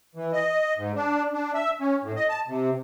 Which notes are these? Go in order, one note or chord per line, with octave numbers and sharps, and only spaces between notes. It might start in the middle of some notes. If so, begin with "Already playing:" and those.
E3
D#5
G#2
D4
D4
E5
C#4
A2
D#5
A5
C3